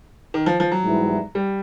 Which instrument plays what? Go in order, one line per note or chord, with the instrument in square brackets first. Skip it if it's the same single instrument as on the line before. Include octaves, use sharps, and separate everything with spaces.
[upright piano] D#3
F3
F3
F#3
[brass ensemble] G#2 E3 G3 B3 E4
[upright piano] G3